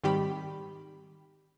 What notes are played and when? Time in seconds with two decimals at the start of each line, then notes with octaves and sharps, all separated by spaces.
0.04 G#2 D#3 G3 C4 G4 B5